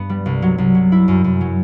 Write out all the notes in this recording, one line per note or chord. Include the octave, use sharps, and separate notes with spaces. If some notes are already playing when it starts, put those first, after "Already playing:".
Already playing: G2 B3
G3
C2
F#3
C2
F#3
E4
F#2
F#2
F#3